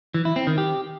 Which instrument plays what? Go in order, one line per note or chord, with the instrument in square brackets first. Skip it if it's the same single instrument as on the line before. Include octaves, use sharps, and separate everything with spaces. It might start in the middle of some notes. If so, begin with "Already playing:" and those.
[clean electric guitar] E3
E4
C4
D#3
G4